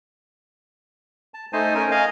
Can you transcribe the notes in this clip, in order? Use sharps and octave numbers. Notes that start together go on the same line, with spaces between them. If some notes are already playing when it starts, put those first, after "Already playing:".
A5
A3 D#4 C5 D#5 G#5 A5
C#4 A#4 G#5
D#5 F5 G#5